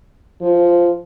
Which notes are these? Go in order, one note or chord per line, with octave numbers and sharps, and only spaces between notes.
F3